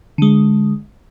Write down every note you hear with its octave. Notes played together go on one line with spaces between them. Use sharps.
D3 G#3